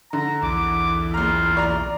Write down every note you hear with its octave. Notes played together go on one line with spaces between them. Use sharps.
D3 A#5
B1 E2 D6
F#1 F4 A#5
D5 A#5